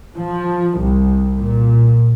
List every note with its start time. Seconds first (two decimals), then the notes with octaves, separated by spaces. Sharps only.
0.15 F3
0.79 C2
1.39 A#2